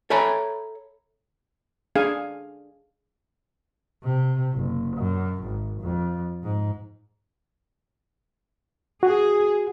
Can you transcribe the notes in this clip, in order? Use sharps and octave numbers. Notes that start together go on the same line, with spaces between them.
A4 C#5 E5 G#5 A#5 B5
D4 G#4 F5 G#5
C3
F#1
F#2
G#1
F2
G#2
F#4 G#4